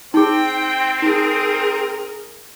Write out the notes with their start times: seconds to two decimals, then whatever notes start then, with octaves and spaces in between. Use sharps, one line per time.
0.14 C4 D#4 G#4 G5
1.02 D#4 G#4 A#4